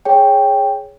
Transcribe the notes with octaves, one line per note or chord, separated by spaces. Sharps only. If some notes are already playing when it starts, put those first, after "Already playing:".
G#4 C#5 G5